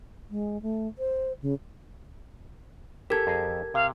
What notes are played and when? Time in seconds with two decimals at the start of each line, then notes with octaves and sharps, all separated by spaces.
0.30 G#3
0.62 A3
0.99 C5
1.42 C#3
3.10 G4 A4 A#4 G#6
3.27 F2 G#4 A#5
3.74 C3 F5